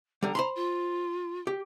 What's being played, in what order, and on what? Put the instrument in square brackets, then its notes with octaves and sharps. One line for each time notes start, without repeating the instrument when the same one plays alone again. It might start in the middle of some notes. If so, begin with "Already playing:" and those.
[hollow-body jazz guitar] D3 G3 [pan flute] A#5
[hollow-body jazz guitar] C5 B5 C6
[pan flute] F4
[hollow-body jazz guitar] G4